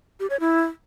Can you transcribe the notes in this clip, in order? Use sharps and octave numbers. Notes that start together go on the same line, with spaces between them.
G4
C#5
E4